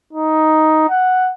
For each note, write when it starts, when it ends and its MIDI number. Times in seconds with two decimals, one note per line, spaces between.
0.13 0.87 63
0.89 1.31 78